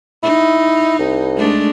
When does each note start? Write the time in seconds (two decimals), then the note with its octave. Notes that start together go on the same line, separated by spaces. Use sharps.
0.23 D#4 E4
0.99 C2
1.37 G#3 A3 D4